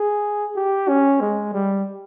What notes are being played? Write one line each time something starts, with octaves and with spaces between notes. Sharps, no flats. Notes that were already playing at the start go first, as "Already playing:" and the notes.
Already playing: G#4
G4
C#4
G#3
G3